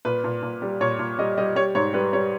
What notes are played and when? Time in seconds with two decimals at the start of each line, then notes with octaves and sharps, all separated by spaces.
0.05 A#2 B4
0.24 A#2
0.43 A#2
0.62 G3
0.81 A#2 C#5
0.99 A#2
1.18 G3 D#5
1.37 G3 D#5
1.56 G3 C#5
1.75 G#2 C#5
1.94 G3 B4
2.13 G3 C#5